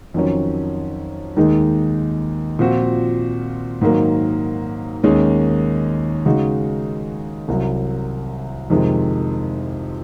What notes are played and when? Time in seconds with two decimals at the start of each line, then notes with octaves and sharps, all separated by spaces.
0.14 F2 D#3 F#3 C#4
1.36 D#2 D#3 G#3 D#4
2.59 A#2 F3 C4 F#4
3.81 G#2 D#3 F#3 A#3
5.03 D#2 D#3 G#3 C#4
6.26 C#3 G#3 D#4 F#4
7.48 C2 C3 F#3
8.70 F2 C3 D#3 G#3